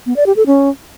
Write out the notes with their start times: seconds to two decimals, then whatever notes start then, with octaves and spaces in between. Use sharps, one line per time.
0.06 B3
0.16 D5
0.26 G4
0.36 A4
0.46 C#4